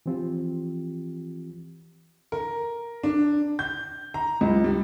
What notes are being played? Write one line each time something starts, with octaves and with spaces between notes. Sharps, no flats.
E3 F3 C4 F4 G4
A#4
D4
G6
A#5
C#2
G3